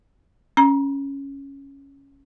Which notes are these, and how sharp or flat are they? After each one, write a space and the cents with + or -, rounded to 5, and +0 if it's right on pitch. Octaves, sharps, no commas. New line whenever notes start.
C#4 +0 A#5 +25